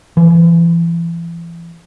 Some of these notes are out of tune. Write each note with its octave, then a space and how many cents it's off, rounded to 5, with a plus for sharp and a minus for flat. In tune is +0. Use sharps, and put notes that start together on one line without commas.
E3 +35